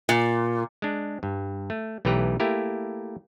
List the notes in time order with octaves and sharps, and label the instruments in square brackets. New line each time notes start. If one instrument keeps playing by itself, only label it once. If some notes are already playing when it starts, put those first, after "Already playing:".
[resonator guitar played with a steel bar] A#2
[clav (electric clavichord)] G#3 D4
G2
A3
B1 E3 A3 G4 B4 A#5
A3 A#3 E4 G4 A#4